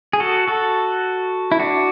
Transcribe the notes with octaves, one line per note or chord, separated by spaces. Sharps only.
G#4
F#4 A4
F#4 A4
E4
D4 F#4